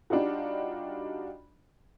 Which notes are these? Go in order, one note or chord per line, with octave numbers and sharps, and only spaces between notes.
G3 D4 D#4 F4 F#4